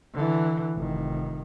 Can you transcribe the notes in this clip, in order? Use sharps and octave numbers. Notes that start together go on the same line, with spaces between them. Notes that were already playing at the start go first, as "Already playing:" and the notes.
D3 E3
F1 D#3